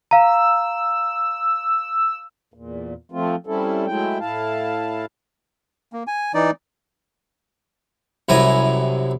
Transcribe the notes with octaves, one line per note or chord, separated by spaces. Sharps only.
F5 A#5 E6
E2 A#2
F3 A3 C4 F4
G3 C4 C#4 E4 A4
F#3 G#3 A3 E4 G5
A2 E4 F5 A5
A#3
G#5
E3 D#4 D5
C2 F#2 E4 G#5 A#5